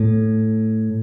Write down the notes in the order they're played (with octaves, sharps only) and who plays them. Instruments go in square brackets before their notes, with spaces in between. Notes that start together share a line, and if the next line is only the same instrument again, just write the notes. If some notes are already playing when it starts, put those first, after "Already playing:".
Already playing: [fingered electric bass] A2